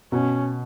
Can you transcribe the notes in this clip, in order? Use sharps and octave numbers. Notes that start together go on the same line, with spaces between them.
B2 C#4